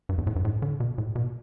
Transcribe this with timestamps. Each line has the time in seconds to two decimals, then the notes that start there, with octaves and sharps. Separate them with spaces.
0.09 G2
0.18 E2
0.27 A2
0.36 G2
0.45 A2
0.62 D3
0.80 B2
0.98 A2
1.15 B2